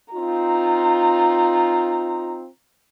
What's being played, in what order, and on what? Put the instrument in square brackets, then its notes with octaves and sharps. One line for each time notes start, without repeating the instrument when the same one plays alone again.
[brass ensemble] C4 D#4 F4 [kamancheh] A#5